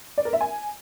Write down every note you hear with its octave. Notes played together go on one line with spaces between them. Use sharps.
D5
A#4
E5
G#5